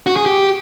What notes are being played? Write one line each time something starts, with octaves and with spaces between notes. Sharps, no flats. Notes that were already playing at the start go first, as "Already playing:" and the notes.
F#4
G#4
G4